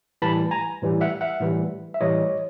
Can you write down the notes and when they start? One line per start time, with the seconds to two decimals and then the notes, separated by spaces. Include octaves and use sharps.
0.22 A2 E3 G3 A5 B5
0.51 G#5 A#5
0.82 A2 E3 G3
1.01 E5 F#5
1.21 E5 F#5
1.41 A2 E3 G3
1.94 E5
2.01 A2 E3 G3 C#5 D#5